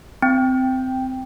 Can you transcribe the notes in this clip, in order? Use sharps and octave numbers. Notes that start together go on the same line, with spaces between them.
C4 G5